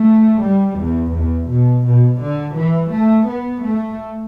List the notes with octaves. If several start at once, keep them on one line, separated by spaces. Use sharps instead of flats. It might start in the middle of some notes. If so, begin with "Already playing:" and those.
Already playing: A3
G3
E2
E2
B2
B2
D3
E3
A3
B3
A3